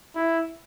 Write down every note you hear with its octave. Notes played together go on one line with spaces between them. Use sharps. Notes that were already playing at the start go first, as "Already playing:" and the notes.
E4